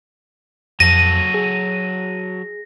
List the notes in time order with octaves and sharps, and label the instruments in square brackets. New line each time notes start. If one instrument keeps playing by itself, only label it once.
[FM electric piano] F2 [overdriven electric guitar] F#3 A4 [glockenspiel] A#6 [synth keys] D#7
[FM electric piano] G#4